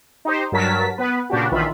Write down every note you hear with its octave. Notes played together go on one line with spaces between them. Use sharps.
D#4 G4 C5
G2 F#3 A#4 A5 B6
B3 B4
A#2 C#3 D4 F#4 G4
A#1 D#3 E3 F4 E5 B5